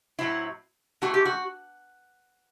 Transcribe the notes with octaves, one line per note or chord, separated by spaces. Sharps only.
A2 F#3 C4 E4
E3 A3 C4 F#4
G4
F#4